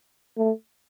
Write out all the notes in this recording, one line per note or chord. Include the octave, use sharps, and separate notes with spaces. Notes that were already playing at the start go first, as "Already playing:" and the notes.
A3